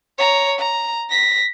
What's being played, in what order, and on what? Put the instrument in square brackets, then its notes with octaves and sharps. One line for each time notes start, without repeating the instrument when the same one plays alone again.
[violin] C#5 A#5
A#5
A#6 B6